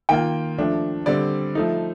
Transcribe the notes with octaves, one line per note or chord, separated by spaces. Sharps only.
D#3 A#3 F4 G5
F3 A3 D4
D3 G3 C4 D5
F3 A3 D#4